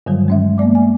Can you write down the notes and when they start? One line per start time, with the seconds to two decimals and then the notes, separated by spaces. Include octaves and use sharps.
0.06 G2 D3 D#3 F#3 G3
0.28 G#3 C#4 E5
0.58 A#3 B3 D5 D6
0.75 G#5